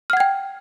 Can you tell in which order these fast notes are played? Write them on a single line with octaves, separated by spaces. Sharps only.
F6 F#5 G#6 G5